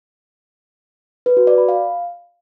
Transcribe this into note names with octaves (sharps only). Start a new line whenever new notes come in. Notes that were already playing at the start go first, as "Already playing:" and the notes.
B4
F#4
D5
B5
F5